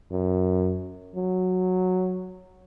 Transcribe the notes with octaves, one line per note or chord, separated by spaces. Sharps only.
F#2
F#3